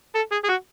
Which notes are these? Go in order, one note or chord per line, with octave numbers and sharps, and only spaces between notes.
A4
G#4
G#4
F#4